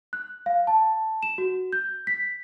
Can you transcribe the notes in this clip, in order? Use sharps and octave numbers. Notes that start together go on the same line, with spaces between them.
F#6
F5
A5
E7
F#4
G6
B6